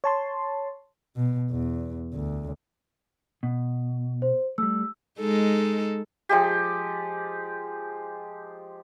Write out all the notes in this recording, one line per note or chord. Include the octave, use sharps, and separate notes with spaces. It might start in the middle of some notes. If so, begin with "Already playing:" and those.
C#5 A5 C6
B2
E2
D2
B2
C5
G3 A3 E6
G#3 D#4 A4
F3 G#3 G4